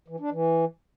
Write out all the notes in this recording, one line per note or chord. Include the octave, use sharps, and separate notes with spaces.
E3
D4
E3